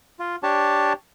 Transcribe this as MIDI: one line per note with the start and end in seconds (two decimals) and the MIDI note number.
0.20 0.36 65
0.43 0.93 62
0.43 0.93 67
0.43 0.93 73
0.43 0.93 81